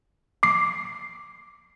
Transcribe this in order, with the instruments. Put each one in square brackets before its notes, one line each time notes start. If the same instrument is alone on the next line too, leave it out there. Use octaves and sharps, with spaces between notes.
[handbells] D6 C7